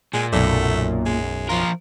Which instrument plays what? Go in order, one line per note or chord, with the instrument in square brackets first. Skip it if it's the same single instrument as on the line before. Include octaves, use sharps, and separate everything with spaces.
[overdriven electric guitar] A#2 [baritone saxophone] G#3
[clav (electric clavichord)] B1 D5 [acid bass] F#2 [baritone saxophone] A3
[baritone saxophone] G#3
[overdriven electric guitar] F3 A#4 [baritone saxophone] F4